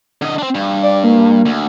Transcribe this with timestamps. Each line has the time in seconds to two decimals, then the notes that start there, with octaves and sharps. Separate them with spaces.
0.22 D3 D#5
0.38 C4 D4
0.55 G2
0.83 D5
1.04 A#3
1.46 D2